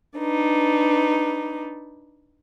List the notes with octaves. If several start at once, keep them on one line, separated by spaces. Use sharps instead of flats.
D4 D#4 B4